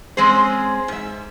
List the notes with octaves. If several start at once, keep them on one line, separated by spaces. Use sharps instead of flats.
G#3 C4 C#4 G#4 C5
G#2 E5